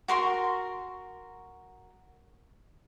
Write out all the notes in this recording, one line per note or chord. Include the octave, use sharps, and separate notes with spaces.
F#4 A#4 C6 C#6